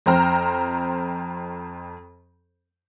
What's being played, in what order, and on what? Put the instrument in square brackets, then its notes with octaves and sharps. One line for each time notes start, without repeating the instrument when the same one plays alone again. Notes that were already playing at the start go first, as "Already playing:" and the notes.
[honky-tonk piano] F2 C4 C5 G5 A#5 F6